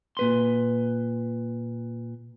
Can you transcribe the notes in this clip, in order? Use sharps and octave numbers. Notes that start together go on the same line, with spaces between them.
A#2 B4 C6